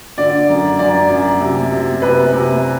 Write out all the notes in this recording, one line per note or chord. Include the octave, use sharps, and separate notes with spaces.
D3 D5
F#2
F#2 D5
F#2
C3
C3
C3 B4
C3